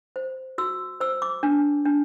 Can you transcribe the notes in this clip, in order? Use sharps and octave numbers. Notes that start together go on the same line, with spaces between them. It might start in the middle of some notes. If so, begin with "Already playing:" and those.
C5
F#4 E6
C5 E6
D6
D4
D4